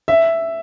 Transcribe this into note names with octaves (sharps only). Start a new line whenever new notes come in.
E5